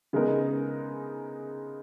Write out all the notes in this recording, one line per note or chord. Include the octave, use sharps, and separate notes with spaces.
C#3 G#3 B3 D#4 A#4